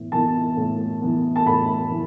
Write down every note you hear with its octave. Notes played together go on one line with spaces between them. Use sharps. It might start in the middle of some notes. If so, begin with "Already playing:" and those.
Already playing: A2 E3 B3
E3 B3 A5
A2
E3 B3
A5
A2 B5
E3